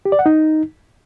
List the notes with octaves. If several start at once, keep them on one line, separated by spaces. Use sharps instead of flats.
G4
D5
F#5
D#4